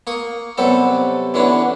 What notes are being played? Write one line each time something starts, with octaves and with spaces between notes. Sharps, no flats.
A#3 C#6 D#6
C3 F#3 G3 B3 A4
D3 E3 B3 C#4 D4